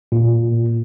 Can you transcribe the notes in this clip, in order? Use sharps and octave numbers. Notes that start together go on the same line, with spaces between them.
A#2